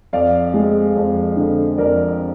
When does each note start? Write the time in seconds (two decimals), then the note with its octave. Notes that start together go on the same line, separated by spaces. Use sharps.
0.13 F2 D5 F5
0.54 G#3
0.96 F2
1.37 D3
1.78 F2 A#4 D5